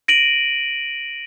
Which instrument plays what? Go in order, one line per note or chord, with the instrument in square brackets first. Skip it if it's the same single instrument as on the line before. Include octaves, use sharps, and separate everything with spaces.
[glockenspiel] A#6 D7 D#7 F#7